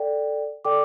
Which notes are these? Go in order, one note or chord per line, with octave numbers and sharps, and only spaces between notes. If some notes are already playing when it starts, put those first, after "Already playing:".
Already playing: A4 D5 G5
A4 D5 G5 D6